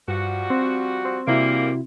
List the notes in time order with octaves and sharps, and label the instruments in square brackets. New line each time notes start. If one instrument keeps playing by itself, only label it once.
[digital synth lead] G2 [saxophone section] F3 G3 F#4
[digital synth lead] C4
C4
[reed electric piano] C3 E4 F#4 [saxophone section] E3 G3 A#3